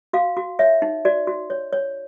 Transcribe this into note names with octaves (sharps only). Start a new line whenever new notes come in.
F#4 F5
F#4
C#5 E5
D#4
F#4 D5
F#4
C#5
C#5